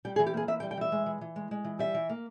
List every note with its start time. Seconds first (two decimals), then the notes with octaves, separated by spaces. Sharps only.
0.05 G3 G5
0.16 G#4
0.19 E3
0.26 G4
0.34 A#3 G#4
0.48 E3 E5
0.60 G5
0.63 G3
0.71 G5
0.77 E3 E5
0.92 G#3
1.06 E3
1.21 E3
1.36 G#3
1.51 G#3
1.65 E3
1.79 G3 E5
1.94 E3
2.09 A#3